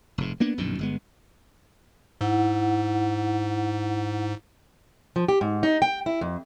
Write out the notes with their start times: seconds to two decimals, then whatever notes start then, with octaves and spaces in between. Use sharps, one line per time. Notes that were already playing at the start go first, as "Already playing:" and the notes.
0.18 F1 G#2
0.40 A#3 B3 D4
0.58 A#1 F#2 B2 D#3
0.79 G1 G#3 B3
2.21 G#2 E4 F#5
5.16 F3
5.28 G4
5.41 G#2
5.63 D#4
5.82 G5
6.06 E4
6.21 F2